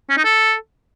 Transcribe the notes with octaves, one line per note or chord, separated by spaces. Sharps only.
C#4
D#4
A4